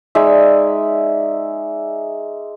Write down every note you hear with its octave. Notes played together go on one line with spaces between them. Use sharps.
G#3 D#4 D5 E5